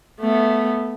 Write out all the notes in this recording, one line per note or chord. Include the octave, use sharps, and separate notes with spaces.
A3 B3